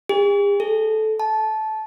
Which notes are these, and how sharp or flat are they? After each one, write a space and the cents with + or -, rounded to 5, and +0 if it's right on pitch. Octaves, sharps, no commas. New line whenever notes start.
G#4 -45
A4 -15
A5 -20